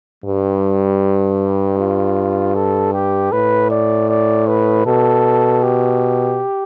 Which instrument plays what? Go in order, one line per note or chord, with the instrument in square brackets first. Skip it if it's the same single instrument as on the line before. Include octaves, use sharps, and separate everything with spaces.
[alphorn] G2 [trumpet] G3
[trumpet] F4
A4
G4
[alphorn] A2 [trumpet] B4
[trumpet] D5
D5
B4
[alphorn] B2 [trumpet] A4
[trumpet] G4